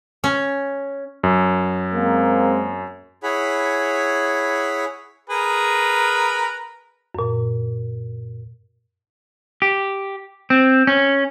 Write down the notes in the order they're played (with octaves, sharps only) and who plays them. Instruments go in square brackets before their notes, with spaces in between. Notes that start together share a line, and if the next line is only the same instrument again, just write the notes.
[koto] C#4
[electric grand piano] F#2
[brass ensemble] G#3 A#3 C4
[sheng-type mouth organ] E4 G#4 C#5 F#5 B5
[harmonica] G#4 A#4 B4
[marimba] F#2 A#2
[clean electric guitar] G4
C4
C#4